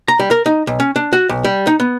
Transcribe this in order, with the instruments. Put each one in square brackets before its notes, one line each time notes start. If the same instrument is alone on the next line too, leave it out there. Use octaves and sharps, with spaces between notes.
[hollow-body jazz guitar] A#5
G3
A#4
D#4
B1
C#4
D4
F#4
B1
G3
D#4
B3